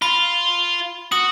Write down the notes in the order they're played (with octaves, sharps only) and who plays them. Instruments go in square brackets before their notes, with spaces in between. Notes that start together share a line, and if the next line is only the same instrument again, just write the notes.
[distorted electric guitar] F4 [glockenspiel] B5
[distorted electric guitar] F#4 [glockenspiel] D#6